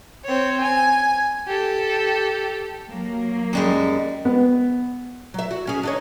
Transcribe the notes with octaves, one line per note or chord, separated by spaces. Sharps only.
C4 C#5
G#5
G4 A4
F#3 A#3
F#2 G3 G#3
B3
F#3 E5
F#4
C#4 G#4
D4 D#4 C#5